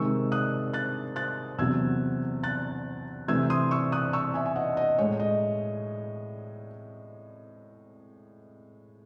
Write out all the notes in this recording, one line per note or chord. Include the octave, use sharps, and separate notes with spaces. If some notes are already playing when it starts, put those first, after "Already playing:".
Already playing: C3 D#3 G#3 C#6 E6
D#6 F#6
F#6 A6
F#6 A6
E2 C3 F#3 E6 G#6
F#6 A6
C3 E3 A3 E6 G#6
C6 D#6
C#6 E6
D#6 F#6
C#6 E6
E5 G#5
G#5
D#5 F#5
D#5
A2 G#3 C#5
D#5